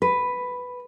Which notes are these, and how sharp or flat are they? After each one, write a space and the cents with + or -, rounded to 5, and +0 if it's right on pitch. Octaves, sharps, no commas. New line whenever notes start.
B4 +5